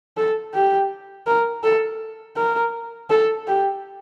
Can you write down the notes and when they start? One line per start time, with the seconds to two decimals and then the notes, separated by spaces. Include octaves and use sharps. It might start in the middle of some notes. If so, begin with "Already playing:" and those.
0.17 A4
0.54 G4
1.27 A#4
1.63 A4
2.37 A#4
3.10 A4
3.47 G4